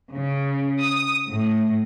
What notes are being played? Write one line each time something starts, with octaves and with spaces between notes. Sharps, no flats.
C#3
D#6
A2